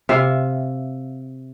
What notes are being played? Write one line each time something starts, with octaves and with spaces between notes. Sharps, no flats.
C3 E5 F5